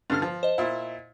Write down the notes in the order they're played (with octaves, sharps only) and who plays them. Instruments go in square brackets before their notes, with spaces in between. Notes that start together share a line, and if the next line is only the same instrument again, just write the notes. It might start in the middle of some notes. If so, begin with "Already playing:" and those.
[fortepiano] G2 D3 F6
F3
[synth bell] C5 D#5
[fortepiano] A#2 E4